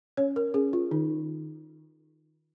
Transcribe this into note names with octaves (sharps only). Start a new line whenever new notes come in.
C#4 C#5
A#4
C#4 G#4
F4
D#3 D#4